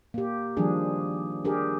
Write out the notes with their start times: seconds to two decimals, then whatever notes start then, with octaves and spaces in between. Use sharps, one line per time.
0.14 A#3 G4
0.57 D#3 F3 G3 D4 G#4
1.45 D4 G4 G#4 A#4